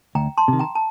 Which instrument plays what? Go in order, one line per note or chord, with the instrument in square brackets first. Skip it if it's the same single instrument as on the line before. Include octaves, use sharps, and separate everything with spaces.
[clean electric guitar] D2 [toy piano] G5 A#5
[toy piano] A5 C6
[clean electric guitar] C3 D#3
[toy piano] G5 A#5
A5